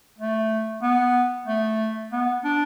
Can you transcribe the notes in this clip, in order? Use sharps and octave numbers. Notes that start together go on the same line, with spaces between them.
A3
B3
A3
B3
D4